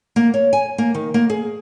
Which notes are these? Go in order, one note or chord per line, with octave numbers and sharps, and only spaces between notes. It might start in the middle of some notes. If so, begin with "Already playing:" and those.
A#3
C#5
G#5
A#3
D#3
A#3
G#4